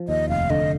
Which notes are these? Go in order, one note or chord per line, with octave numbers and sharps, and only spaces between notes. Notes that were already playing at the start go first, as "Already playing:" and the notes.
Already playing: F3
D#2 D#5
F1 F5
D3 D#5